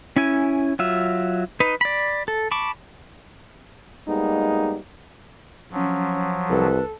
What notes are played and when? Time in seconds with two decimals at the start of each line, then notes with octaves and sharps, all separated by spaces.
0.16 C#4 E4 G#5
0.79 F#3 F4 E5
1.60 D#4 B4
1.81 D5 B5
2.28 A4
2.51 A5 B5 C#6 D6
4.07 G3 G#3 A#3 B3 D#4
5.72 F3 F#3 C#4
6.50 C2 A4 B4